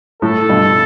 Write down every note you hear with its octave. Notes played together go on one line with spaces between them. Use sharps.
A2 A4
G2 B2